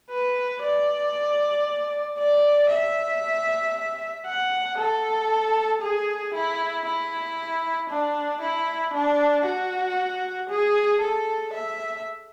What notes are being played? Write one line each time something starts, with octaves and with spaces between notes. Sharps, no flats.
B4
D5
D5
E5
F#5
A4
G#4
E4
E4
D4
E4
D4
F#4
G#4
A4
E5